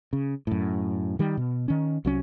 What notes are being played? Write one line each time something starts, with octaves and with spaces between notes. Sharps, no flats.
C#3
F#2 A2
D#3 G3
B2
D#3 C#4
C2 F#3 C#4